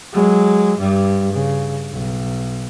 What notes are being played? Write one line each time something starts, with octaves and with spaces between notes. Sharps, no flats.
F#3 G#3
G2 G3
C#3
B1